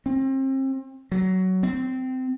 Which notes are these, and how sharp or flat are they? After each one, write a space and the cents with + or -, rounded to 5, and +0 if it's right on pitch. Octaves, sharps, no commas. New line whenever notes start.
C4 +35
F#3 +15
C4 -20